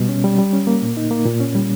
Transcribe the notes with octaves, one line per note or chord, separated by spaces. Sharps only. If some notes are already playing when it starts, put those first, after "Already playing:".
Already playing: B2 G3
C#4
G3
G3
C#4
A#3
A#2
D#4
A#3
A#2
C#4
G3